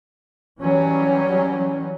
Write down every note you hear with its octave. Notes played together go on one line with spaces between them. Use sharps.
E3 F#3 G3 C#4